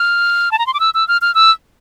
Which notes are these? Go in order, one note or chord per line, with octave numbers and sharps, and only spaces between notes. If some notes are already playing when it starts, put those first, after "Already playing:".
Already playing: F6
A5
A#5
C6
D6
E6
E6
F6
F6
E6